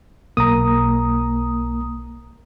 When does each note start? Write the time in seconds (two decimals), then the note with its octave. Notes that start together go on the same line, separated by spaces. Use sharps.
0.37 B1 A#3 A#5 D#6